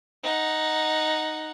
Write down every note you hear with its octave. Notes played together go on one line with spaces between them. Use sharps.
D#4 F#5